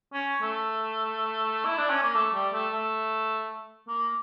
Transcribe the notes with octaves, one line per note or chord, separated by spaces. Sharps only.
C#4
A3
E4
D4
C#4
A#3
A3
G3
A3
A3
A#3